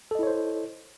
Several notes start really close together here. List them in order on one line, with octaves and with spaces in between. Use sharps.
A4 D#5 E4 C#5 C5